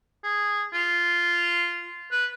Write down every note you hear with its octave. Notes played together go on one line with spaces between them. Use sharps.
G#4
F4
B4